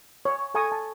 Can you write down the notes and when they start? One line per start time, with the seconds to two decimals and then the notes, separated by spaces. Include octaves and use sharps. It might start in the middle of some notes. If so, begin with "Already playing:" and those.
0.25 C#5
0.54 A4 E5 G#5 A#5 C#6 D#6
0.72 A5